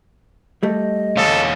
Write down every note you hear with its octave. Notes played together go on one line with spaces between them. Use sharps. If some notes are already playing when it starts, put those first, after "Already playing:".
G3 A3 D#5
E2 A4 C#5 F5